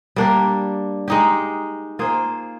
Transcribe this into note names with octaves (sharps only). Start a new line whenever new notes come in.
G3 A#3 D4 G4
G#3 D#4 G4
A#3 F4 G#4 C5